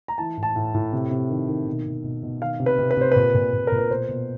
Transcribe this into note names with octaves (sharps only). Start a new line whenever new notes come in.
A#5
E3 A5
A2
A5
A2
A2
C3
C3
D#3
D#3
B2
B2
B2
B2
D#3 F5
C3
B4
C3
B4
C3 C5
A#2 B4
A#2
A#2
A#2 A#4
B4
B2 C5
B2